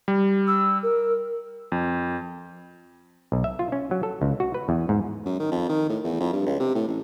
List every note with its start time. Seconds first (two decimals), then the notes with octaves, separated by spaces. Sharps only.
0.08 G3
0.47 E6
0.83 A#4
1.72 F2
3.32 B1
3.44 E5
3.59 F4
3.72 C#4
3.91 F#3
4.03 A4
4.22 C#2
4.40 F#4
4.54 B4
4.69 E2
4.89 G#2
5.25 F#2
5.39 D#3
5.52 F2
5.69 D#3
5.89 A2
6.04 E2
6.20 F2
6.33 G2
6.46 C#2
6.60 C3
6.75 A2
6.88 A1